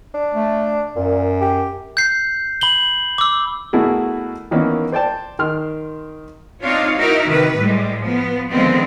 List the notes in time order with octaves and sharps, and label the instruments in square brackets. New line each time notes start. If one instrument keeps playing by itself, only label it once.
[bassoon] D4
[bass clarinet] A3
[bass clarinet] F#2 [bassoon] A#2
[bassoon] G4
[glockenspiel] G6 C7
B5 F#7 G7
D6 E6
[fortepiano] B2 A3 A#3 E4 F#4 G#4
D#3 E3 A#3 B3 C#4
C5 D5 G5 A5
D#3 C6 F6
[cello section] C4 D4 D#4 F4 C#5 F5
D#4 E4 F#4 A#4 E5
C3 D#3 B4
A2 G3 G#3
F3 B3
D3 D#3 F3 G#3 B3 C4